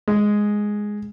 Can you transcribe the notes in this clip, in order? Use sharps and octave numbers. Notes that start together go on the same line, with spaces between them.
G#3